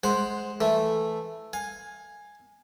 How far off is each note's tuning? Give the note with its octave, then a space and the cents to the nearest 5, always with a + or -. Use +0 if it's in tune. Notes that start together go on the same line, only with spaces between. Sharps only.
G#3 +15 C5 +0 F#5 +0
E3 +0 A3 +0
F5 +25 G#5 +0